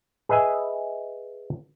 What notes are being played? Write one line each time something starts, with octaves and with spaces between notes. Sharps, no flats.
G#4 B4 D#5 E5 G#5